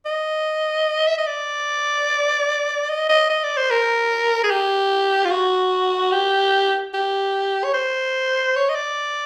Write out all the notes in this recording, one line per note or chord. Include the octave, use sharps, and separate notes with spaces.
D#5
E5
D#5
D5
D#5
D#5
D#5
D5
C5
A#4
G#4
G4
F4
F#4
G4
G4
C#5
C5
C#5
D#5
D5